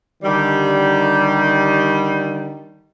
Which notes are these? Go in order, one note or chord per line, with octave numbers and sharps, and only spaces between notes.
D3 D#3 G3